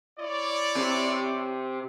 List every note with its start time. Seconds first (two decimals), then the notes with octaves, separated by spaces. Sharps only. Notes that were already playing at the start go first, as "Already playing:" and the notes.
0.19 E4 C#5 D5
0.76 C3